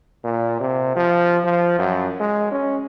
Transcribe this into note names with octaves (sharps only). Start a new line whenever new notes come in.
A#2
C3
F3
F3
F#2
G#3
C#4